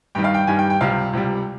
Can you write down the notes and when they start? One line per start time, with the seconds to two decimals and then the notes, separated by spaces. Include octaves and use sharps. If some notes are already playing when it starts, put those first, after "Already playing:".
0.15 G2 D#3 G3 G5
0.24 F5
0.34 G5
0.47 G2 D#3 G3 G#5
0.59 G5
0.70 G5
0.81 C#2 C3 G3 F5
1.13 C#2 C3 G3